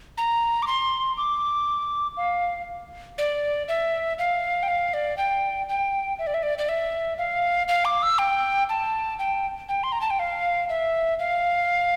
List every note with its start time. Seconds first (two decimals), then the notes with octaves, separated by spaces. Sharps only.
0.18 A#5
0.62 D6
0.67 C6
1.17 D6
2.17 F5
3.18 D5
3.68 E5
4.19 F5
4.63 G5
4.68 F5
4.94 D5
5.18 G5
5.69 G5
6.19 E5
6.27 D5
6.34 E5
6.43 D5
6.58 D5
6.69 E5
7.18 F5
7.68 F5
7.85 D6
8.03 E6
8.19 G5
8.69 A5
9.19 G5
9.69 G5
9.83 C6
9.92 A#5
10.01 A5
10.10 G5
10.19 F5
10.69 E5
11.19 F5